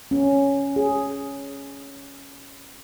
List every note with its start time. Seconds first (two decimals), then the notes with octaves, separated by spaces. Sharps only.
0.11 C#4
0.76 G#4